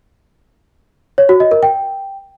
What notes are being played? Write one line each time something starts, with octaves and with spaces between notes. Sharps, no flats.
C#5
F#4
D#5
A#4
G5